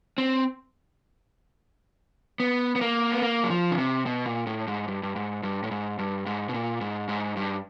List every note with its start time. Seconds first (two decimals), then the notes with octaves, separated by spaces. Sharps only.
0.18 C4
2.40 B3
2.76 B3
2.81 A#3
3.12 B3
3.22 A#3
3.44 F#3
3.50 F3
3.72 C#3
3.78 C3
4.06 B2
4.26 A#2
4.47 A2
4.68 G#2
4.88 G2
5.03 G2
5.16 G#2
5.43 G2
5.64 A2
5.71 G#2
5.99 G2
6.26 G#2
6.49 B2
6.54 A#2
6.81 G#2
7.09 G#2
7.37 G2